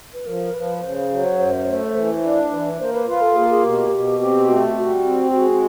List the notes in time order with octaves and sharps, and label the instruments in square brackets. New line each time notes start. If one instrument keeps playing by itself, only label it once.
[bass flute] B4
[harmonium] F3 [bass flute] A#4
[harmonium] F3 [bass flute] B4
[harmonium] C#3 [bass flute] C5
[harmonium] F#3
F#2
A3
E3
D4
[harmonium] E3 [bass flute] B4
[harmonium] A#3 [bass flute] C5
[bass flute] B4
[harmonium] F4 [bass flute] B4
[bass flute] A4
[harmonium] A#3 [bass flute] G#4
[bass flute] G#4
[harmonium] B2 [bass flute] G4
[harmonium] B2
[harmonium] C4 [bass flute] G4
[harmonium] A3 [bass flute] F#4
[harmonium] G3 [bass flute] F#4
[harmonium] C4
[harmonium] G#3 [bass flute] F#4